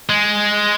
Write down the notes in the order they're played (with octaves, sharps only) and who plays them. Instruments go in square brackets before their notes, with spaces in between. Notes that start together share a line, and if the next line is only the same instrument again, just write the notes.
[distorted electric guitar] G#3